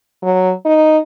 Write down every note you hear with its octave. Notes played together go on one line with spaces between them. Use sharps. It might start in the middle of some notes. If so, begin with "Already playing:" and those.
F#3
D#4